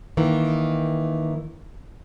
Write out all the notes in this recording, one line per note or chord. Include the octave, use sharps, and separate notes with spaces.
D#3 E3 A#3